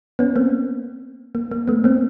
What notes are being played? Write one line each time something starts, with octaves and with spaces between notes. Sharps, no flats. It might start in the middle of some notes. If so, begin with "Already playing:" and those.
B3 C#4
A#3 C4
A#3
A#3
A3 B3
A#3 C4